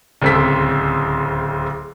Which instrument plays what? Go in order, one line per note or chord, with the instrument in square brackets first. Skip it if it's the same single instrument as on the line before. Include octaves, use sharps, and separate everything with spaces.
[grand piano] D1 C#2 C4 A4 B6